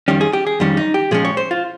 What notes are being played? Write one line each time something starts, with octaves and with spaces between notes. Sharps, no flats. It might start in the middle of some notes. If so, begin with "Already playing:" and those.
F2 D#3 G3 C#4 G4
G#4
G4
G#4
F2 D#3 G3 C#4
D#4
G4
A#2 F3 G#3 C#4 G#4
C#5
C5
F4